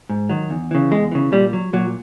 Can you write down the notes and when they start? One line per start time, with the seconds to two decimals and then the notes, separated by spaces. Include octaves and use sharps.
0.09 G#2
0.29 D#3 F#3
0.50 E2
0.71 C#3 E3
0.91 E2 G#3
1.12 C#3 E3
1.32 A#2 G3
1.53 F#3
1.73 A#2 F#3